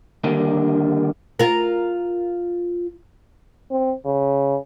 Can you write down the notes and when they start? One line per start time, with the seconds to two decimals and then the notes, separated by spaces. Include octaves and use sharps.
0.24 D3 D#3 G3 A#3 D4
1.39 F4 A#4
3.71 C4
4.05 C#3